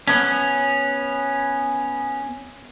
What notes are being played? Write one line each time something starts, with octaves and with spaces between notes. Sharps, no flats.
B3 C#4